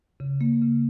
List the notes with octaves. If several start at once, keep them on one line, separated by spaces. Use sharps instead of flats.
C#3
A#3
C#3